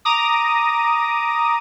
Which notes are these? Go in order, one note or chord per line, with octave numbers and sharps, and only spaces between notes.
A#5 D6 D#6